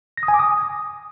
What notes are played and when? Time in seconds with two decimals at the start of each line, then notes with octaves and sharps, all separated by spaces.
0.17 A#6
0.23 D#6
0.28 G#5
0.34 D6
0.39 D#6